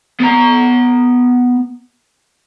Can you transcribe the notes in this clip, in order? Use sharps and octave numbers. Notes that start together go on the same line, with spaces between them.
B3 A#5